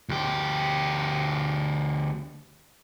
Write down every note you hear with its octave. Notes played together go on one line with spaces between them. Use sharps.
D2 G4